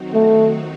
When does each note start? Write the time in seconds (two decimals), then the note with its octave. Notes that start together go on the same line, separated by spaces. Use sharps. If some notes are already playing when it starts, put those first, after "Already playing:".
Already playing: D#3 F#3 C4 D#4 F#4
0.15 A3